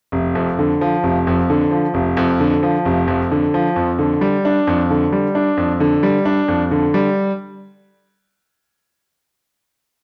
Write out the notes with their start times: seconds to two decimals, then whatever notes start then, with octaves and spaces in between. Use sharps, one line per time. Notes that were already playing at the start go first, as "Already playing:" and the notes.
0.12 F1
0.35 F2
0.59 D3
0.81 F3
1.03 F1
1.27 F2
1.50 D3
1.71 F3
1.94 F1
2.17 F2
2.40 D3
2.63 F3
2.85 F1
3.07 F2
3.31 D3
3.54 F3
3.76 F2
3.99 D3
4.21 G3
4.45 D4
4.67 F2
4.90 D3
5.12 G3
5.35 D4
5.57 F2
5.80 D3
6.03 G3
6.25 D4
6.48 F2
6.71 D3
6.94 G3